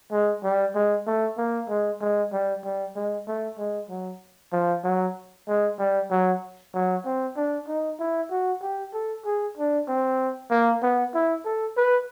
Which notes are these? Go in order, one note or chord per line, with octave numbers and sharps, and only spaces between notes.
G#3
G3
G#3
A3
A#3
G#3
G#3
G3
G3
G#3
A3
G#3
F#3
F3
F#3
G#3
G3
F#3
F#3
C4
D4
D#4
E4
F#4
G4
A4
G#4
D4
C4
A#3
B3
E4
A4
B4